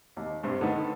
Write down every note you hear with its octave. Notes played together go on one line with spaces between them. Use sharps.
D#2
G2 C3
D3 D#3 B3